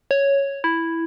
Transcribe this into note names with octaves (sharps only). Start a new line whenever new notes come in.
C#5
E4